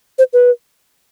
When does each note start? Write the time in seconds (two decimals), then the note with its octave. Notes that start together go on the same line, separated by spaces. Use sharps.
0.18 C5
0.33 B4